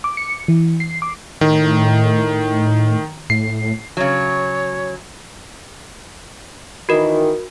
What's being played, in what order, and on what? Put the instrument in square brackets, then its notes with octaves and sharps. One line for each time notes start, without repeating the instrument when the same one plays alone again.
[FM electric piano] D6
C#7
E3
C7
D6
[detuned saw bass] A2 [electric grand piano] D#3
[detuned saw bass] A2 [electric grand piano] C7
[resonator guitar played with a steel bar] C#3 F#3 [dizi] C#5
[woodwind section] D#3 E3 [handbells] F#4 A#4